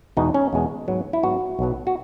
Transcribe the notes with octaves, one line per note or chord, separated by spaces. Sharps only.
E2 B2 G#3 B3 D#4
C#4
E2 B2 G#3 B3
G#2 F#3 B3
E4
G#2 F#3 B3 F#4
B1 B2 F#3 B3
F#4